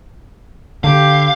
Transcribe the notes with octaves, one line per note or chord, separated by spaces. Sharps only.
D3 G4 F5